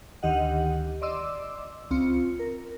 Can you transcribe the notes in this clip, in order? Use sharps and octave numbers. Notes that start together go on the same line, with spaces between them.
D2 D#3 G4 D#5 F#5
D5 D#5 C6 D6 E6
C#2 C4 F4 C#7
A#4